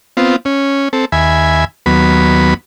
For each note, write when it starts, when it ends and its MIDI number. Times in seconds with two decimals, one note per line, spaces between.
0.17 0.36 59
0.17 0.36 60
0.17 0.36 65
0.45 0.89 61
0.93 1.05 60
0.93 1.05 69
1.12 1.65 39
1.12 1.65 76
1.12 1.65 80
1.12 1.65 83
1.86 2.54 39
1.86 2.54 54
1.86 2.54 59
1.86 2.54 83